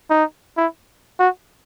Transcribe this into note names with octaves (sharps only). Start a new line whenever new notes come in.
D#4
E4
F#4